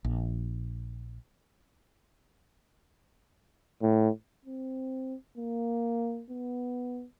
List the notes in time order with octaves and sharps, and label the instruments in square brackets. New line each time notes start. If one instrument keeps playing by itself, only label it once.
[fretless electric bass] A#1
[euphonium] A2
C4
A#3
B3